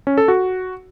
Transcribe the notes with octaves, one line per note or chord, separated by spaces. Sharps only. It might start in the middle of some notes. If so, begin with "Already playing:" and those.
C#4
A4
F#4